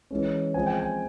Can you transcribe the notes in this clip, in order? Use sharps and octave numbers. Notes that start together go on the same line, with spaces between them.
E3 G#3 C#4
F3 G#3 C4 G#5
G5
G#5